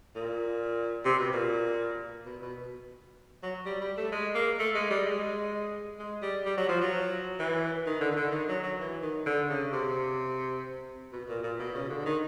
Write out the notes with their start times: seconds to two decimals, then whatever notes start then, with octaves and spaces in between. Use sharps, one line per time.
0.16 A#2
1.05 C3
1.18 B2
1.33 A#2
2.26 B2
2.42 B2
3.43 F#3
3.65 G3
3.81 G3
3.97 A3
4.12 G#3
4.35 A#3
4.59 A3
4.75 G#3
4.90 G3
5.05 G#3
5.99 G#3
6.22 G3
6.45 G3
6.58 F#3
6.69 F3
6.81 F#3
7.39 E3
7.86 D#3
8.01 D3
8.11 D#3
8.16 D3
8.32 D#3
8.49 F#3
8.63 F#3
8.80 E3
9.02 D#3
9.26 D3
9.50 C#3
9.73 C3
11.13 B2
11.29 A#2
11.43 A#2
11.59 B2
11.75 C#3
11.90 D3
12.06 D#3